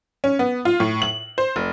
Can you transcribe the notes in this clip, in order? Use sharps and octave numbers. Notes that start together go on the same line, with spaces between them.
C#4
B3
F4
A2
F#7
C5
F1